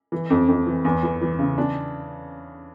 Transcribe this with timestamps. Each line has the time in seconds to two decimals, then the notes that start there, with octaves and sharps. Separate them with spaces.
0.12 E3
0.30 F2
0.48 F2
0.67 E3
0.85 E2
1.03 E3
1.21 E3
1.38 C#3
1.58 D4